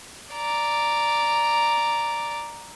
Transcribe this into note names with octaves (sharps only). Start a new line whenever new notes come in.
D5 A#5